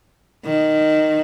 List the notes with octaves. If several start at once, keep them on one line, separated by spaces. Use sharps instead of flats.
D#3